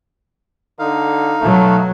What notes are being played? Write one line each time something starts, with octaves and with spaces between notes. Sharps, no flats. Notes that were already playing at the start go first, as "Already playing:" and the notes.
D3 D#4 F5
B2 F#3 A3